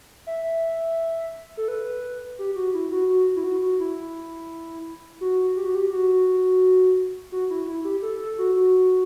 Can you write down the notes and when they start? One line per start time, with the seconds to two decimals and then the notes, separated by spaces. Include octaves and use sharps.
0.27 E5
1.57 A4
1.68 B4
2.39 G4
2.56 F#4
2.74 E4
2.92 F#4
3.09 F#4
3.36 E4
3.44 F#4
3.62 F#4
3.80 E4
5.21 F#4
5.56 G4
5.66 F#4
5.75 G4
5.91 F#4
7.32 F#4
7.50 E4
7.68 E4
7.85 G4
8.02 A4
8.20 A4
8.38 F#4
8.56 F#4